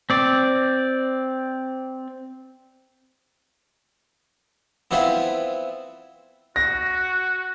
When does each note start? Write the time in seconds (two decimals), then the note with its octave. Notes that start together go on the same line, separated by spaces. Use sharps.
0.10 C4 D5
4.91 B3 C4 E4 F4 C5 B5
6.56 F#4 A#6